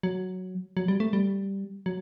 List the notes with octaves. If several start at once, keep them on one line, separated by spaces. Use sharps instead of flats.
F#3
F#3
G3
A3
G3
F#3